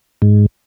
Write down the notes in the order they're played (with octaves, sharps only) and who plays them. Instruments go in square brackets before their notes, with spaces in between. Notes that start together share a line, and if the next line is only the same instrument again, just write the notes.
[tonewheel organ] G#2